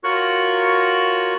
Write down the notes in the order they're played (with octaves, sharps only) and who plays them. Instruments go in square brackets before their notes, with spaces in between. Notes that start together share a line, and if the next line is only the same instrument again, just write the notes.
[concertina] F4 F#4 A#4 C#5 C#6 F#6